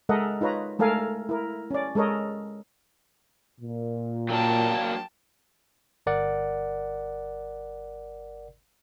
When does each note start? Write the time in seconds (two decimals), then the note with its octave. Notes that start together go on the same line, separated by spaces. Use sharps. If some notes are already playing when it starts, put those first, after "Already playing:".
0.09 G#3 A4 A#4 D#5 E5 F#5
0.41 D#4 F4 B4 C#5 A#5
0.79 G#3 A3 A4 A#4 F5 G#5
1.29 E4 A#4
1.71 C#4 D5
1.95 G#3 A4 A#4 C#5 D#5
3.60 A#2
4.29 F#3 A#3 D4 G5 A5
6.06 G1 A#4 D5 F#5